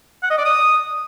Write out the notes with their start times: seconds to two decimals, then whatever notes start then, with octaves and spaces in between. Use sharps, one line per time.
0.23 F#5
0.31 D#5
0.38 D5
0.45 D#6